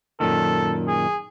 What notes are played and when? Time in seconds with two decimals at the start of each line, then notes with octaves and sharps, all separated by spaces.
0.20 F#2 A#2 D#3 A4
0.87 G#4